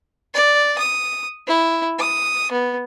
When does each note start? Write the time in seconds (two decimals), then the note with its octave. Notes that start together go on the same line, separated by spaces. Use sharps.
0.34 D5
0.78 D#6
1.47 E4
1.99 D#6
2.51 B3